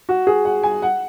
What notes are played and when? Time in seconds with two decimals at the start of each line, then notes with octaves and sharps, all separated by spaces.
0.09 F#4
0.27 G#4
0.45 F#5
0.63 G#5
0.82 F#5